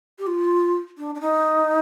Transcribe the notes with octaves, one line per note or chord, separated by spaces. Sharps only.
G4
F4
D4
D4
D#4